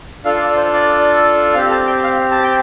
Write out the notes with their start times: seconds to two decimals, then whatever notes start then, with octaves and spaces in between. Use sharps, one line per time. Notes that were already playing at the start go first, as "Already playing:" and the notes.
0.24 D4 F4 A4 F5
0.37 F5
0.41 D5
0.57 C5
0.73 D5
1.54 C4 G4 F5
1.71 A5
1.87 G5
2.03 F5
2.31 A5
2.44 G5